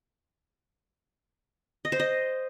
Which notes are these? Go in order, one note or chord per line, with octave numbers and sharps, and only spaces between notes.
D#5
C5
D#5